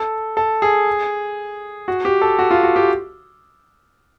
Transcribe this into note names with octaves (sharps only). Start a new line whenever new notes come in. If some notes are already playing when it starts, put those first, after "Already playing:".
Already playing: A4
A4
G#4
F#4
G4
A4
F#4
F4
F#4
G4